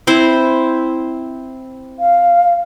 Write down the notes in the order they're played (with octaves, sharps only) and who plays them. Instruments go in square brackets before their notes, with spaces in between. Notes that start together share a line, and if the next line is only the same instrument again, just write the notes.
[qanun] C4 E4 C5
[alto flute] F5